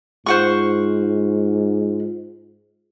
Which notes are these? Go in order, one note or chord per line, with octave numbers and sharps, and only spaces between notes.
G#2 F4 C5 F#5 C#6